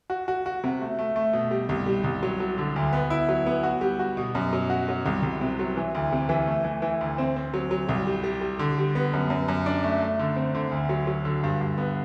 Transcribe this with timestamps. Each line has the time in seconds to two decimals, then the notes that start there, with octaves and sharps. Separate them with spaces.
0.10 F#4
0.28 F#4
0.46 F#4
0.64 C3
0.81 A3
0.98 A3
1.16 A3
1.33 B2
1.51 G3
1.69 C2
1.86 G3
2.04 C2
2.23 F#3
2.40 F#3
2.58 D3
2.76 D2
2.93 B3
3.10 E4
3.29 F#3
3.46 B3
3.63 F#4
3.81 G3
3.99 F#4
4.17 B2
4.35 F#2
4.53 F#3
4.70 F#4
4.88 F#3
5.06 C2
5.23 C2
5.41 C3
5.59 F#3
5.77 E3
5.95 D2
6.12 C3
6.29 E3
6.47 A3
6.64 E3
6.82 E3
7.01 D2
7.18 C4
7.36 C4
7.54 F#3
7.71 F#3
7.89 C2
8.07 G3
8.24 G3
8.41 G3
8.59 D3
8.78 G3
8.95 B3
9.13 F#2
9.30 F#2
9.48 F#2
9.66 D4
9.84 A3
10.01 A3
10.19 D3
10.36 C4
10.55 D3
10.71 D2
10.89 F#3
11.07 F#3
11.25 D3
11.43 G2
11.61 G2
11.78 B3